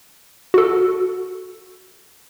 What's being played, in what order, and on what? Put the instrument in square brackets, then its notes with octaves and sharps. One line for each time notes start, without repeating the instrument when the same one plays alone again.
[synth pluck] F#4 A4